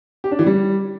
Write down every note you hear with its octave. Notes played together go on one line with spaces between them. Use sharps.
G4
D4
E3
G3